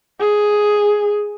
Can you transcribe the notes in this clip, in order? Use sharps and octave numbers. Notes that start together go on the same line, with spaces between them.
G#4